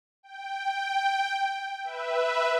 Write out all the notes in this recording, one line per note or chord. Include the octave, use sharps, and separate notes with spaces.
G5
B4 E5